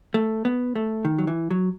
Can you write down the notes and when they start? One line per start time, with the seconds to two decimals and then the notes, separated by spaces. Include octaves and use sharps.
0.14 A3
0.45 B3
0.75 A3
1.05 D#3
1.18 F#3
1.27 E3
1.51 F#3